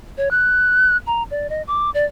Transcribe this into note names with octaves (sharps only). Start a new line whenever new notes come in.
C#5
F#6
A#5
D5
D#5
D6
D5